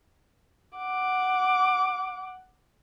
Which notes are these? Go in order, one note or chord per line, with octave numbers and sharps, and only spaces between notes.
F#5 D6